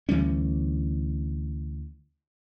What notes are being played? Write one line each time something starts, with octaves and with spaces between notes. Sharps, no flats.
D2 E3 G3 C#4